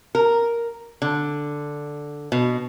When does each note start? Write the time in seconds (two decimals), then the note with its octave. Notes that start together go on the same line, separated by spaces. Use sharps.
0.15 A#4
1.02 D3
2.32 B2